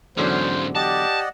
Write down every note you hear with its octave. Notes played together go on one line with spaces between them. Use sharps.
E2 G#2 D3 F#3 C#4 C5
G4 D5 D#5 F#5 A5